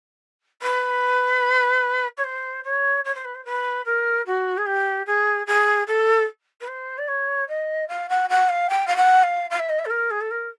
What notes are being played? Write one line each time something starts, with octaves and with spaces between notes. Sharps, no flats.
B4
C#5
C5
C#5
C#5
C5
B4
C5
B4
A#4
F#4
G#4
G4
G#4
G#4
A4
B4
C5
D5
C#5
D#5
F5
F#5
F#5
F5
G5
F5
F#5
F5
F5
E5
D#5
E5
A4
A#4
G#4
A4
A#4